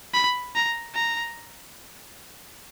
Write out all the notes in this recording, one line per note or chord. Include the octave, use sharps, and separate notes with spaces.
B5
A#5
A#5